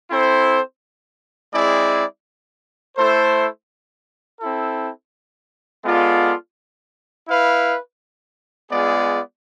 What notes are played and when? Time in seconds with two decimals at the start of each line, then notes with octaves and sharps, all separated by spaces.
0.10 C4 E4 A4 C5
1.53 G#3 C4 E4 G#4 D5
2.96 A3 E4 A4 C5
4.39 C4 E4 A4
5.83 G#3 B3 F4 A4 D5
7.26 E4 B4 F5
8.71 G#3 B3 F4 G#4 D5